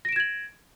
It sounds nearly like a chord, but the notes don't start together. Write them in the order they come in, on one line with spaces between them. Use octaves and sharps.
A#6 D7 E7 G#6 F#7